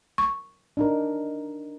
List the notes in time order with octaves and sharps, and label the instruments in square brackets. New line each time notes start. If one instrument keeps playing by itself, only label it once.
[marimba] C#6
[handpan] D4 D#4 A#4